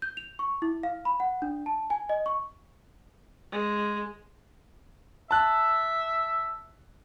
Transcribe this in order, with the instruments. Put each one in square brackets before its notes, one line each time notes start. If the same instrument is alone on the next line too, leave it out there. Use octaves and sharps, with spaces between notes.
[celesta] G6
F7
C#6
E4
F5
B5
F#5
D4
A5
G#5
D#5
C#6
[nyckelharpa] G#3
[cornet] E5 [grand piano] A5 F#6